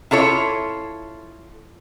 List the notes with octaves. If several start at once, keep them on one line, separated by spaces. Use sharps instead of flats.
E4 F4 A4 C#5